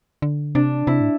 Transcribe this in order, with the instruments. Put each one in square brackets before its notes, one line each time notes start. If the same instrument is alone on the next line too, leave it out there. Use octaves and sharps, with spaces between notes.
[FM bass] D3
[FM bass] C3 [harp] D4
[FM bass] C3 [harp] E4
[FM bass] A2